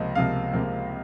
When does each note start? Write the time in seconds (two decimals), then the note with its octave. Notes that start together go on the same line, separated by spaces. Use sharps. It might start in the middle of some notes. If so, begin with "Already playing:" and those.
Already playing: C#2 C3 F3 A#3 D#5
0.15 C#2 C3 F3 A#3 F5
0.53 C#2 C3 F3 A#3